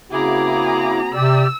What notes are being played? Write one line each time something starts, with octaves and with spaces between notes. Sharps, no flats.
C#3 A#3 C4 E4 F#4 G#4 A#5 D6
C3 G4 D5 E6